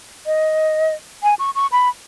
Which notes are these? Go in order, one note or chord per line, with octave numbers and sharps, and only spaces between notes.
D#5
G#5
C#6
C#6
B5